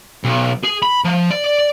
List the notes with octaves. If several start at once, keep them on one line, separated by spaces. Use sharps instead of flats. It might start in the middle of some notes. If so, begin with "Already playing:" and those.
B1
G#4
B5
F3
D5